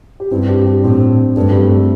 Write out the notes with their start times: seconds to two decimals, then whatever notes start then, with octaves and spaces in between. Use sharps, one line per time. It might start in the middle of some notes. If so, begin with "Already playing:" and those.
0.20 G4
0.31 G2 C4 E4
0.49 D4 G4
0.66 D4 G4
0.83 A2 C4 E4
1.36 G2 A3 D4
1.50 G3 C4
1.63 A3
1.77 A3